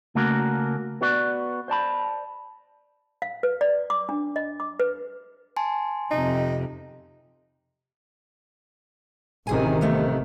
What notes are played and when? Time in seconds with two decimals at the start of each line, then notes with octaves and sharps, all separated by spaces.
0.15 C#3 A3 A#3 F#4 A#4 A#5
1.01 B3 F#4 B4 D5
1.68 C5 D5 A5 B5
3.22 F5
3.43 B4
3.61 D5
3.90 D6
4.09 D4
4.36 D#5
4.60 D6
4.80 B4
5.56 G#5 A5 C6
6.11 F2 C3 D#4
9.47 A1 C3 D#3 E4 G#4 G#5
9.81 F3 A3 B3